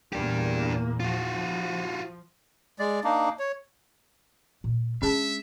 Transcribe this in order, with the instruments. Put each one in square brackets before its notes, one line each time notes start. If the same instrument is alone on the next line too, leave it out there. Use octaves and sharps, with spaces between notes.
[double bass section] E2 A#2 A#3 [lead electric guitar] D4 G4
[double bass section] F3 [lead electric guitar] F4 F#4
[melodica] G#3 D5
A#3 D4 D#4
C#5
[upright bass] A#2
[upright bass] G#3 D4 [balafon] C#4 G#4 A5 [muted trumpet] E5